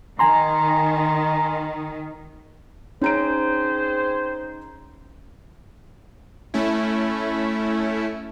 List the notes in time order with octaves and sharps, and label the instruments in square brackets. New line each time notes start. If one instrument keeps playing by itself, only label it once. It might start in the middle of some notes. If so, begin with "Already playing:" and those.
[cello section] D#3 [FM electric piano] G#5 A#5 C6
[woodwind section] C4 G#4 C5 [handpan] C#4 [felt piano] D#4 A#5 D7
[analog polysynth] A3 C#4 E4